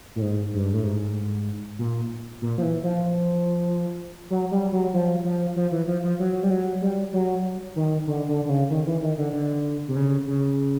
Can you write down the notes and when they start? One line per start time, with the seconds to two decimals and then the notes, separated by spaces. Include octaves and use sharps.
0.16 A2
0.22 G#2
0.54 G2
0.73 A2
0.84 G#2
1.79 A#2
2.42 A#2
2.58 F3
2.63 E3
2.83 F3
4.30 F#3
4.51 G3
4.72 F#3
4.93 F3
5.24 F3
5.56 F3
5.71 E3
5.87 F3
6.04 F3
6.19 F#3
6.43 G3
6.51 F#3
6.81 G3
7.13 F#3
7.76 D#3
8.07 D3
8.28 D3
8.45 D3
8.49 C#3
8.70 D#3
8.87 E3
9.02 D#3
9.17 D3
9.33 D3
9.88 C3
9.96 C#3
10.28 C#3